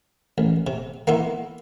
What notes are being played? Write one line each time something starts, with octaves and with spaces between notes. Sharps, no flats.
A1
C3
A#3 B3 E4 F4